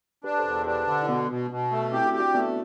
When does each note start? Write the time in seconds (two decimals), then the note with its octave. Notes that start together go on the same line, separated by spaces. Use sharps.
0.24 D4 G4 B4
0.38 A4 C5
0.45 E2
0.66 D4 G4 B4
0.87 D3
1.02 E4
1.08 B2 B3 D4
1.30 B2
1.50 B2
1.72 A3
1.92 C4 E4 G4
2.06 D4 F#4
2.13 G4
2.20 D4 F#4
2.34 A3 B3 D4